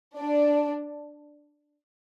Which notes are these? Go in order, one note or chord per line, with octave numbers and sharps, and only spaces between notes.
D4 D5